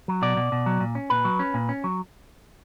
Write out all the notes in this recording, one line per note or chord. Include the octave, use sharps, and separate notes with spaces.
F#3
B2 D5
B2
B2
F#3
A#2
C#4
A#2 B4
F#3
C#4
A#2
C#4
F#3